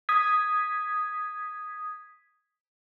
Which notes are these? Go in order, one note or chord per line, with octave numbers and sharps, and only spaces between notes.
D#6 G#6 B6